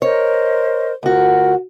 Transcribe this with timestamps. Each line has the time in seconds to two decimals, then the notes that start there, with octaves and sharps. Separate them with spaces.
0.02 A#4 C5 C#5 D#5
1.03 D2 F4 F#4 A#4